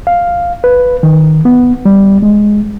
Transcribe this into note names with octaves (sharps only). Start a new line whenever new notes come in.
F5
B4
D#3
B3
G3
G#3